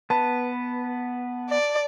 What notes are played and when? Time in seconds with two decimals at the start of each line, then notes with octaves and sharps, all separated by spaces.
0.10 B3 B4 A5
1.49 D5